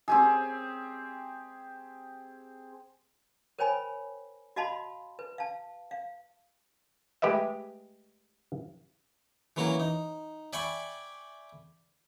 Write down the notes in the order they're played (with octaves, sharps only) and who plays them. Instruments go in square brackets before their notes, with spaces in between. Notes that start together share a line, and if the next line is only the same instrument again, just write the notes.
[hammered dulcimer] C4 G4 G#4
[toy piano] A#4 C5 C#5 G5 G#5 B5
F#4 D#5 F5 A5 B5 C6
B4
F5 A5
F5
[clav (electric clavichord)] G#3 A3 G4 B4 D#5 E5
[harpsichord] E3 F#3 A#3 C#4 F#4
D#4
D5 E5 G5 G#5 B5 C#6